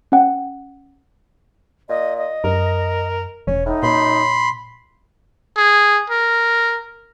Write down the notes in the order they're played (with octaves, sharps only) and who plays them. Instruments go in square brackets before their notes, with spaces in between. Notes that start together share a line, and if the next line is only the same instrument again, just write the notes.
[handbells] C#4 F#5 G5
[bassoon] A#2 [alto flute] D#5
[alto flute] D#5
[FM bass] F#2 [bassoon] A#4
[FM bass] E1 [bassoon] C#4
[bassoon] A2 [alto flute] D#4
[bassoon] F#2 [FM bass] A#2 [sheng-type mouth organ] B5 C6
[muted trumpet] G#4
A#4